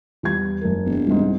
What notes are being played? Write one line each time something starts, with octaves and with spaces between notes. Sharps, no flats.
E2 G3 G#6
F#1 A#4
E1
C2 G#2